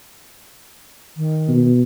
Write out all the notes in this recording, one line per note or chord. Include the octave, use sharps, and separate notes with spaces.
D#3
B2